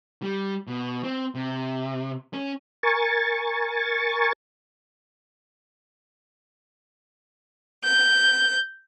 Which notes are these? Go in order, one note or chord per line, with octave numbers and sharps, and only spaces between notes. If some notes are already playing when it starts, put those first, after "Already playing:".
G3
B2
C4
C3
C#4
A#4 G#5 C#6 A6
G6